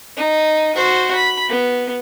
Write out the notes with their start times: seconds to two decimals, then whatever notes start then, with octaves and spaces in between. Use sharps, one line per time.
0.17 D#4
0.75 F#4 C5
1.15 B5
1.48 B3